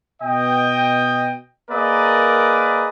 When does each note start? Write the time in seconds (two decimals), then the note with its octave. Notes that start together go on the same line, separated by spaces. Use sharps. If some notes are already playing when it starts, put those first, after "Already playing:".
0.22 B2 D#5 G5
1.70 A#3 G#4 A#4 B4 D5 D#5